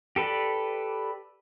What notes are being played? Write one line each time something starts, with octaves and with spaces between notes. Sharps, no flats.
G4 A4 B4 D5